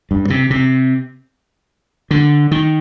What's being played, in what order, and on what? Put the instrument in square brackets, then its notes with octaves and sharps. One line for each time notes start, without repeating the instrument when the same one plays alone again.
[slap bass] G2
C3
C3
D3
D#3